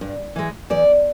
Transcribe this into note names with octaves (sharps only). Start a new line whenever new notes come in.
G2
E3 G#3
E2 D5